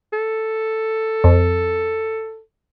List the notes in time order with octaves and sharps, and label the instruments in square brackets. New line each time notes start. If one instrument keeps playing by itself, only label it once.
[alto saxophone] A4
[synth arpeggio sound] F2